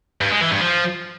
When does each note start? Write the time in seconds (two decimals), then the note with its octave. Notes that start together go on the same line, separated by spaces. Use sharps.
0.21 G2
0.31 G#3
0.41 E3
0.51 G2
0.61 F3